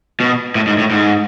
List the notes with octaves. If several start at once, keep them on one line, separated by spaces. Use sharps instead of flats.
B2
A2
G#2
A2
G#2